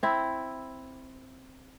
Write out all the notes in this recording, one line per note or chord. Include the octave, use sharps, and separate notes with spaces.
C4 E4